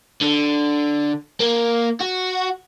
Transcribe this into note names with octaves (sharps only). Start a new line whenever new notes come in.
D3
A#3
F#4